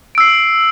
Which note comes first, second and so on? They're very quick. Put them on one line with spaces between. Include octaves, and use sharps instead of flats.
D7 E6 C7